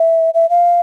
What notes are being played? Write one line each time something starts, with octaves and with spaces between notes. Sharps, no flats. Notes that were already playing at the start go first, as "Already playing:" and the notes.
Already playing: E5
E5
F5